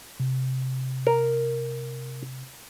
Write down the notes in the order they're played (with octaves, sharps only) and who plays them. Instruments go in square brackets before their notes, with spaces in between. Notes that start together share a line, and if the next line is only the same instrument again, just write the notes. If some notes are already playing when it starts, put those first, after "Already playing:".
[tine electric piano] C3
[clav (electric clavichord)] A#4